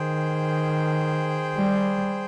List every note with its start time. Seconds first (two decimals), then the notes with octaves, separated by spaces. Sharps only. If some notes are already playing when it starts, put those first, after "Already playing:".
Already playing: D#3 G#4 C5 G5
1.58 G3